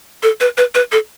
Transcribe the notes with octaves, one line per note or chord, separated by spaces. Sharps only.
A4
B4
B4
B4
A4